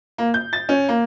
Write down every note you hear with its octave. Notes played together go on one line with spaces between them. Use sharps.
A#3
G6
A6
C#4
A#3